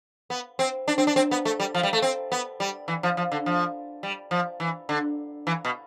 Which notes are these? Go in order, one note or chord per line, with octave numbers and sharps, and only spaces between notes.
B3
C4
D4
C4
D4
C4
B3
A3
G3
F3
G3
A3
C4
B3
G3
E3
F3
F3
D3
F3
G3
F3
E3
D3
E3
B2